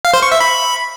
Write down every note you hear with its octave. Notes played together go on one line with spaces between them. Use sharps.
F5
C5
C#6
E5
B5